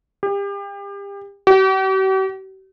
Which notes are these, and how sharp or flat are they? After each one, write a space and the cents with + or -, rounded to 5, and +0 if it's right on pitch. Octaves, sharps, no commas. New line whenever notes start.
G4 +35
G4 -45